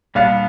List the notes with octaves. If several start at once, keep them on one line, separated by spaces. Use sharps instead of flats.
A#2 G3 B3 D4 F5